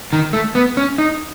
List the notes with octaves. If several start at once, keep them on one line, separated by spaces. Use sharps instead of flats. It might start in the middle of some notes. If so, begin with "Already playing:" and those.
D#3
A3
B3
C#4
D#4